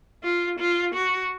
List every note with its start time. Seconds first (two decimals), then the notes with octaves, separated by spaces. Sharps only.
0.24 F4
0.59 F4
0.94 F#4